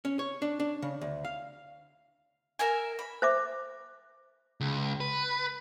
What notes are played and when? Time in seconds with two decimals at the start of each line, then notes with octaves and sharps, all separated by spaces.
0.05 C#4
0.19 C#5
0.42 D4
0.60 D4
0.82 C#3
1.01 D2
1.25 F5
2.59 A#4 E5 G#5
2.99 B5
3.22 C5 E5 D6
4.61 C#2
5.00 B4